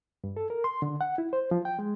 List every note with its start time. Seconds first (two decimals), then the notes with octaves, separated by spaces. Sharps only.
0.24 G2
0.37 A4
0.50 A#4
0.64 C6
0.82 D3
1.01 F#5
1.18 E4
1.33 C5
1.51 F3
1.65 G5
1.79 G#3